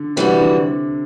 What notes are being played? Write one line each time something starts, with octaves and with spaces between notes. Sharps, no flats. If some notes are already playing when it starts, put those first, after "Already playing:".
Already playing: D3
C3 E3 G3 C4 F#4
D3